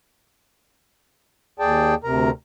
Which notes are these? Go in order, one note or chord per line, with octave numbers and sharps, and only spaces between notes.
D#2 G#4 D5 G5 A5
D2 C3 A#4 A#5